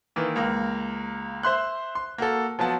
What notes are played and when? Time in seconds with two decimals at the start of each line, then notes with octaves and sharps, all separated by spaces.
0.16 D#3 E3 A#3
0.36 C#2 A#3
1.43 C5 E5 C6 F#6
1.95 C6
2.18 A#3 F#4 A4
2.59 F3 F#3 B3 A5